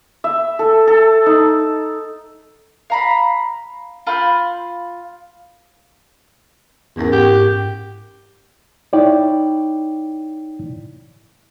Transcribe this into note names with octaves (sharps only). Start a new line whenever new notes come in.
E5
A4
A4
D#4
F5 A#5 B5
F4 B5 C6 G6
E2 G#2 C#4 A#4
G#2 G4 F#5 G5
D#4 E4 C#5 D5 G5